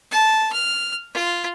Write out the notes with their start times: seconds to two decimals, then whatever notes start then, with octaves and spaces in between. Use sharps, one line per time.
0.12 A5
0.53 F6
1.14 F4